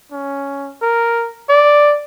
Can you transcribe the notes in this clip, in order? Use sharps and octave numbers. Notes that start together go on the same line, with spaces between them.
C#4
A#4
D5